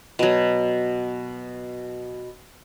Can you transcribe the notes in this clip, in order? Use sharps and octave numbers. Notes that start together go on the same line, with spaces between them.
B2 F#3